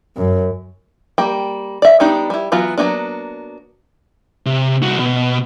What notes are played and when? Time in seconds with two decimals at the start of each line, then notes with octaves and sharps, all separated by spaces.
0.17 F#2
1.18 G3 A#3 G5
1.82 D5 E5
2.00 G3 B3 D4 D#4 G4
2.30 G3 E4
2.52 E3 F#3 B3 F4 F#4
2.78 F#3 G#3 A#3 B3 D4
4.46 C3
4.82 C2 F#4
4.99 B2